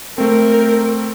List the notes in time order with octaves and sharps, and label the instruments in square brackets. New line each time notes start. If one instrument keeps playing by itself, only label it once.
[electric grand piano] A3 C4 [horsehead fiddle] A#4